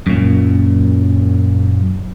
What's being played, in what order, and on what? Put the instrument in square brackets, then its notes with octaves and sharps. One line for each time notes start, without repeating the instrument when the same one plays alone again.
[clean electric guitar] F#2 A#2